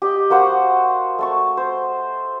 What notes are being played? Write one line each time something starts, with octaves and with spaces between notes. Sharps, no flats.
G4 D#5
A#3 F#4 C5 F#5
A3 A5 C#6
C5